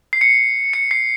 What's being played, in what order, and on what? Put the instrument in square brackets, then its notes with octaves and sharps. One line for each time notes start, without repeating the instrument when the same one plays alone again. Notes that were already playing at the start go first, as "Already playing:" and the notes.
[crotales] C7
C#7
C#7
C7